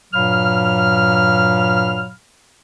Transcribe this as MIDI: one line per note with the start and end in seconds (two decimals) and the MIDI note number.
0.14 2.11 43
0.14 2.11 46
0.14 2.11 54
0.14 2.11 77
0.14 2.11 83
0.14 2.11 89